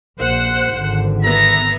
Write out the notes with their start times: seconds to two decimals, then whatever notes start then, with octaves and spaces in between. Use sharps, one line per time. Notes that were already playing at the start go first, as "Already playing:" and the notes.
0.20 A#1 C5 F#5
0.74 G#1 D3
1.24 B3 E5 A#5